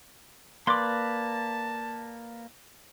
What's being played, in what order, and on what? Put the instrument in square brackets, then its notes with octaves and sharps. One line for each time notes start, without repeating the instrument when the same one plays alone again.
[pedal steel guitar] A#3 B4 D5 [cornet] A5 [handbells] C6 D6